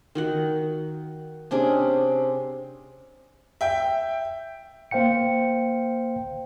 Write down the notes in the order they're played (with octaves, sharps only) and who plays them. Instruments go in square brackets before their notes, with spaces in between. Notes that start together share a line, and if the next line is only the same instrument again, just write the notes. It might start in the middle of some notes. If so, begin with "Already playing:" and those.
[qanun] D#3 F#4 F#5
C3 C#4 D4 G#4
[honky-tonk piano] E5 G5
[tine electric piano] A#3 C5 F5 G5 C#7